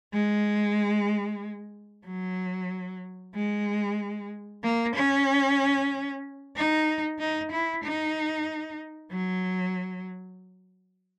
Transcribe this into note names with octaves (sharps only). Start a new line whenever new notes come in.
G#3
F#3
G#3
A#3
C#4
D#4
D#4
E4
D#4
F#3